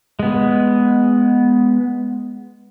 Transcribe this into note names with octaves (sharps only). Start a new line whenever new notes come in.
G#3 B3